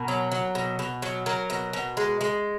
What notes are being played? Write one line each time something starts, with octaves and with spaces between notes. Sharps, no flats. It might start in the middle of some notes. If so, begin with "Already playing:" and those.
Already playing: B2 A#4
F#3
F#3
B2
B2
F#3
F#3 A#4
B2
B2
G#3
G#3